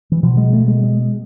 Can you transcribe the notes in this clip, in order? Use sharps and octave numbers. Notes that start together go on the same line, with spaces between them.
E3
B2 F3
G#3
A3
G#3
G#3